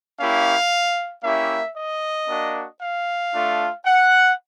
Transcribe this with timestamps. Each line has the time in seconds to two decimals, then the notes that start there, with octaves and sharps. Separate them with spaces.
0.19 A#3 C#4 E4 G4 F5
1.23 A#3 C#4 E4 G4 E5
1.76 D#5
2.28 A#3 D4 F#4
2.81 F5
3.33 A3 D4 F4
3.85 F#5